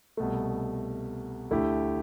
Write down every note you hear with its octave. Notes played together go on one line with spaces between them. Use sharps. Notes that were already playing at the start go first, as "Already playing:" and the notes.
C2 B2 A3
D2 D3 A3 E4 G4